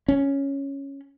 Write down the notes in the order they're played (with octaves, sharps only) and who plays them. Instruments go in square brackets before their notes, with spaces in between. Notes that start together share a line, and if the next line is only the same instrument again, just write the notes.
[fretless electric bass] C#4